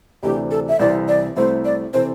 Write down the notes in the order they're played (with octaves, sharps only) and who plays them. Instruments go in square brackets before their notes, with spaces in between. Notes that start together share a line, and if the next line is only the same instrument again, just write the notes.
[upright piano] D2 C3 E3 A3 D4 [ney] G4
[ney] A4
E5
[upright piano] C2 C3 E3 C4 E4 [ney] D5
[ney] D5
[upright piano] C2 C3 A3 C4 E4 [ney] C5
[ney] D5
[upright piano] C3 E3 C4 A4 [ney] C5